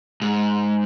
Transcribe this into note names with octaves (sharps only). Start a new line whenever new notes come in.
G#2